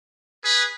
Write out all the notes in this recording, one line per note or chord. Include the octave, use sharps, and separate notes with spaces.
G#4 B4